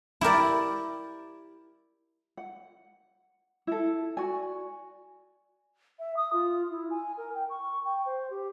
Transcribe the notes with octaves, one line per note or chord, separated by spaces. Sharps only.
E4 G4 A#4 D5
F#5
E4 A4
F#4 D5 G#5
E5
D#6
F4
E4
G#5
A#4
G5
C#6
G5
C5
G4